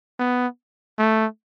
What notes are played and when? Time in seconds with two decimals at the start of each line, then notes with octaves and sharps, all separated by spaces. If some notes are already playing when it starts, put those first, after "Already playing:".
0.19 B3
0.98 A3